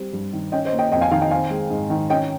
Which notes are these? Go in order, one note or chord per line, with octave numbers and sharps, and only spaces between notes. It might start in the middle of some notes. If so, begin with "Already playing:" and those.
Already playing: G3 C4
G2
D#3
C#4 D#5 G5
C5 D#5
A#3
D#5 G5
F2 D#5 G5
F5 G#5
D#3 F5 G#5
D#5 G5
C4 F5 G#5
G#3
G#2
D#3
C#4 D#5 G5